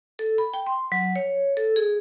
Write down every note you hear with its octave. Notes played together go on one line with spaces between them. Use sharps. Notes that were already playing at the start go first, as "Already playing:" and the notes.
A4
B5
G5
C6
F#3
C#5
A4
G#4